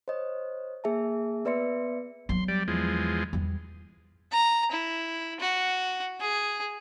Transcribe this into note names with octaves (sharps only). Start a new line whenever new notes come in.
C5 C#5 D#5
A#3 G#4 E5 G#5 A5
B3 B4 D5 E5 C6 C#7
F#3 B3 C6
G3 D5
E2 F3 G#3
E2 G3
A#5
E4
F#4
G#4